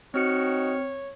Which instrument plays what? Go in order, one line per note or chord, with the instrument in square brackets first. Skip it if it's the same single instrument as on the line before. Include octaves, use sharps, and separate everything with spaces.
[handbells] C4 F6 C#7 [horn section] D#4 F#4 D#5 [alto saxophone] C#5